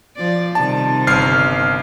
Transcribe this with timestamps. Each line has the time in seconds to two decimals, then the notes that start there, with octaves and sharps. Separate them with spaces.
0.16 F3 D5
0.55 C3 D#3 G3 A5
1.07 G1 F6 C7